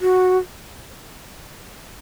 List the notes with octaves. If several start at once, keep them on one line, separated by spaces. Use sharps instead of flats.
F#4